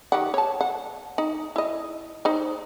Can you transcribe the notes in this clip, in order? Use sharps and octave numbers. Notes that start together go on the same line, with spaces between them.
D#3 G4 F#5
C#5 A5
F#5
D#4
E4 D#5
D#4 C5